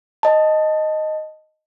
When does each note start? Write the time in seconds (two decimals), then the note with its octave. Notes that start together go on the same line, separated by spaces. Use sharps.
0.23 D#5 A5